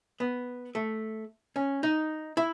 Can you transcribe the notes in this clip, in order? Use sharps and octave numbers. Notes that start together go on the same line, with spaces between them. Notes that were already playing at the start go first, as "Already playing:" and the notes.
B3
A3
C#4
D#4
E4